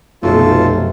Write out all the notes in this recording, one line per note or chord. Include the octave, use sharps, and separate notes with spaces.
F1 B1 F#2 C3 F4 A4